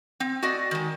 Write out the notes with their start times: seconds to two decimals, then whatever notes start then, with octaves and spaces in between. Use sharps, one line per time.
0.20 C4
0.42 F#4 D5 D#5
0.71 D#3 G#3